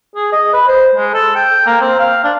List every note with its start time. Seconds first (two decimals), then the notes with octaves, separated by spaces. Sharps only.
0.15 G#4
0.32 D#5
0.53 B4
0.67 C5
0.95 G#3
1.14 A4
1.35 G5
1.66 A#3
1.81 C4
1.99 F5
2.24 D4